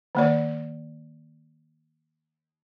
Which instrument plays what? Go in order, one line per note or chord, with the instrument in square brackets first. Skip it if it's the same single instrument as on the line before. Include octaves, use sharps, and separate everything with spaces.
[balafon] D#3 A#3 D5